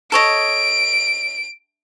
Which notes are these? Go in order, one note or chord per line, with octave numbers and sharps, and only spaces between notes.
A4 C#5 D#5 D7